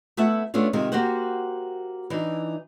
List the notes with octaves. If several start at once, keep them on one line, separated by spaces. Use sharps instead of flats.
A3 B3 E4 E5 F#5 A5
A3 B3 C#4 D4 F4
C3 D#3 G#3 F4
A#3 F#4 G4 C5 F#5
E3 D4 D#4